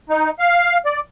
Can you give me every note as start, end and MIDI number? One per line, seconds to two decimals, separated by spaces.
0.10 0.30 63
0.39 0.77 77
0.85 1.00 74